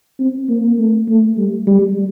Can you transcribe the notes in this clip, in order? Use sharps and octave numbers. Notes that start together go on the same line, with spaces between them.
C4
A#3
A3
A3
G3
G3